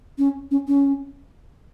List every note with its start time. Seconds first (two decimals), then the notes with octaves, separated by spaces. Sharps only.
0.18 C#4
0.51 C#4
0.68 C#4